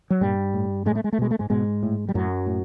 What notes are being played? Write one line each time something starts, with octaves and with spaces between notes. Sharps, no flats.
F#3
G2 A#2 G3
A2
A2 G#3
A3
G#3
A3
B2 G#3
A3
G#2 G#3
G#2 B2 G#3
A2
G3
F#2 A2 F#3
A2